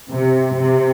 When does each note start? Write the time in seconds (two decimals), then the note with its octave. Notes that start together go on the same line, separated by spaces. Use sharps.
0.11 C3
0.57 C3